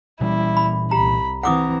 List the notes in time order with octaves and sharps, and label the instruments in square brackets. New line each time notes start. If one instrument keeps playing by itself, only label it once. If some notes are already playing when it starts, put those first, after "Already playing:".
[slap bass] A#2 E3 C#4 [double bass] G3 [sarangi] E4
[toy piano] B5
[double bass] C2 [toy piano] G4 A#5 [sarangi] B5
[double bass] E3 C4 [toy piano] F#5 D6 D#6 [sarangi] A#5